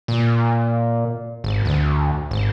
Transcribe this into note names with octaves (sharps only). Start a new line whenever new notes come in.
A#2
G#1
D2
G#1